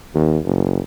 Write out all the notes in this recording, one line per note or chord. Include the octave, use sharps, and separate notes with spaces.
D#2
F#1